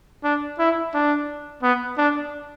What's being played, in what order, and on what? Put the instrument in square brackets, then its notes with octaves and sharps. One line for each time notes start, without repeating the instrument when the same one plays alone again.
[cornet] D4
E4
D4
B3
D4